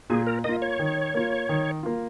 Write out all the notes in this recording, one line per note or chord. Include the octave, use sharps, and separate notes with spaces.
A#2 G#4
A#4
A#3 F4 D#5
C#5
D#3
A#3 F4
D#3
A#3 F4